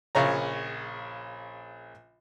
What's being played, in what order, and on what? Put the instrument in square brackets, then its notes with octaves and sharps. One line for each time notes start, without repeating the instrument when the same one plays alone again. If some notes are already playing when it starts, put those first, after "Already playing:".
[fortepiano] A#1 C#3 C#5 A#5